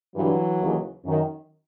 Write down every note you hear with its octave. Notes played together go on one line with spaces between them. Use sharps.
G2 D3 E3 F#3
D#2 C#3 E3
F#2 D#3